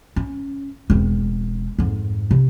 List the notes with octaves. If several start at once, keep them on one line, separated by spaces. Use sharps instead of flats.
C#4
E1 C4
F2 G#2
C3